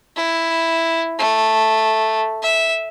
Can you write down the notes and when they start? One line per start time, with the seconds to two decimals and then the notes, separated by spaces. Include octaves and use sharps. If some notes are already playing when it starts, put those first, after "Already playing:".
0.16 E4
1.18 A3
2.42 E5